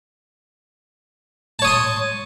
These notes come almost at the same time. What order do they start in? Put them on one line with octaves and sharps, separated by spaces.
A5 C#5 D#6 C6